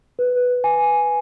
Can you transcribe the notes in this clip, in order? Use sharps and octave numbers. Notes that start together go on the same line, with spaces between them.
B4
G#5